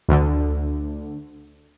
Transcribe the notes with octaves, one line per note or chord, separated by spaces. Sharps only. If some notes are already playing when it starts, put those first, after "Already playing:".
D2 D3